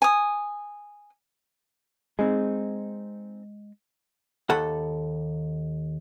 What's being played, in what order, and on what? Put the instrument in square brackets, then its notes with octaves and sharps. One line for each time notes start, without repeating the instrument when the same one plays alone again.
[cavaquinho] G#5 D#6
[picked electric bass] G#3 [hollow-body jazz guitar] C4 D#4 G#4
[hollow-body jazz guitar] D#2 A4 F#5